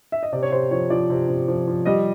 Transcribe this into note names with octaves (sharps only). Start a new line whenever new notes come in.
E5
D#5
C3 D5
C#5
C3 C5
F3 C#5
F3 D5
C3
C3
F3
F3
G3 D#5